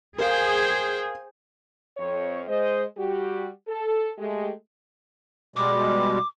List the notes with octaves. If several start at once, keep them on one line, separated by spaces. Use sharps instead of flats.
G#4 A#4 C5 F5 G5
F2 C#5
G#3 C5 D#5
G3 F#4 G4
A4
G#3 A3 G4
B2 G3 G#3 D6